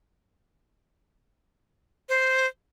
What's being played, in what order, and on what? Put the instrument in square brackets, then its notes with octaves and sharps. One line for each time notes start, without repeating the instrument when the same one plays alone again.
[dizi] C5